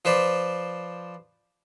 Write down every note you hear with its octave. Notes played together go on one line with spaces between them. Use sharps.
F3 B4 C5 D5